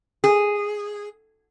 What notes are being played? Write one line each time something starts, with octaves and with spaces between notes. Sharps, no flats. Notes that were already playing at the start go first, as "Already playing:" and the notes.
G#4